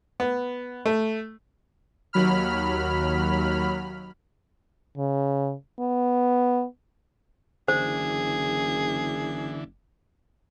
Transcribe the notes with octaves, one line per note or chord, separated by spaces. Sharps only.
B3
A3
D#2 F#3 B5 F6
C#3
B3
F#1 D3 E3 G#4 C5